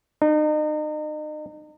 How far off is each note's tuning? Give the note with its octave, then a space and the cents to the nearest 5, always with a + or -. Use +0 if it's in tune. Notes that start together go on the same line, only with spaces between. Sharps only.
D#4 -35